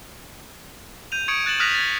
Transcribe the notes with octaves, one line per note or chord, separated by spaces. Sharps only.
G6 D#7 F7
C#6 D#6 G#6 C#7 D7
F#6 A6 E7 F#7
D#6 F6 F#6 A#6 B6 F7
G#6 A6